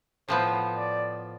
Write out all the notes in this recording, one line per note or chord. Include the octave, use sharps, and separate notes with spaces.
A2 F3 B3 C5
D5